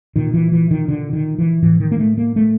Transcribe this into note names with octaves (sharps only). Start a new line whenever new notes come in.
A#2 D#3
E3
E3
D#3
D3
D#3
E3
A2 E3
D#3
A#3
A3
A#3
A3